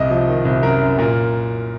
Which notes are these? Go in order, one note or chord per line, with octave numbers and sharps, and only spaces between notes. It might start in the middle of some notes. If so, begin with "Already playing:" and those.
Already playing: C2 D#5
F3
D#3
C2
F#2 A#4
F#2
A#2 A#4